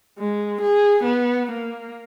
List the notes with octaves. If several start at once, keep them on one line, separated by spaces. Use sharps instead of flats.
G#3
G#4
B3
A#3